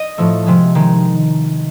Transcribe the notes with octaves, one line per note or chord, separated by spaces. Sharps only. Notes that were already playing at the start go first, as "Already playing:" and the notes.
Already playing: D#5
A2 F3 A3
C3 F3 G#3
D#3 G#3